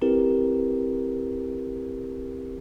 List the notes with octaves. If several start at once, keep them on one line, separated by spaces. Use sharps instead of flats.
C4 E4 G4 A#4 B4